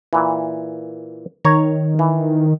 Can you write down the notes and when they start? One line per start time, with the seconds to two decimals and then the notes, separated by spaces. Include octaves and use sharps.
0.13 A#2 E3
1.45 D#3 C#5 A#5
1.99 E3